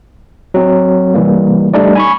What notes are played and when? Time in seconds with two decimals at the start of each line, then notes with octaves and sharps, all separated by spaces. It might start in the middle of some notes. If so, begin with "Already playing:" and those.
0.54 F#3 C4
1.14 C3 E3 G3 A#3
1.74 G3 A3 D4 D#4 D5
1.95 G#5 B5 C#6